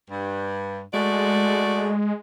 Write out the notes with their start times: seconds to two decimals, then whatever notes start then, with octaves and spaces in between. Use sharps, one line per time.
0.11 G2
0.94 G#3 A3 F#4 D5